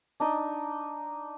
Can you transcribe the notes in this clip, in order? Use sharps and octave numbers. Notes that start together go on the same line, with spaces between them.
D4 D#4 D#5